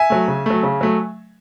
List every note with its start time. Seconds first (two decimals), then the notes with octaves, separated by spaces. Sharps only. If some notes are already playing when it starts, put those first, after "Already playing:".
Already playing: E5 G#5
0.10 F#3 A3
0.28 C#3
0.46 F#3 A3
0.63 C#3
0.81 F#3 A3